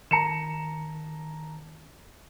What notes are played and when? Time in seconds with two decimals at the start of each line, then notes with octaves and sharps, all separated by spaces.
0.11 D#3 A5 A#5 C#7 E7